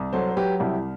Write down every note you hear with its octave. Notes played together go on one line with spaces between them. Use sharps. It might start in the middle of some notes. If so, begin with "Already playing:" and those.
Already playing: C2
F#3 A4 C5
C5
F#3 G4 B4
C2 E4 G4